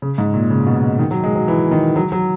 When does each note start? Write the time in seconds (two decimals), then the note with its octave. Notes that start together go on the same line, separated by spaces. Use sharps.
0.02 C#3
0.18 G#2
0.34 A#2
0.51 C#3
0.67 B2
0.99 D#3
1.11 F#3
1.24 G#3
1.35 F#3
1.48 E3
1.71 D#3
1.96 F#3
2.12 F#3